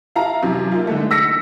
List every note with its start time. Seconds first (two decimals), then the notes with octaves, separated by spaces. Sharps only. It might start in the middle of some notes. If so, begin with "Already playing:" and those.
0.16 E4 F5 A5 A#5
0.42 F#2 C3 E3
0.72 A#3 D#4 F4
0.87 D3 G#3 A3
1.11 E6 A#6 B6 C#7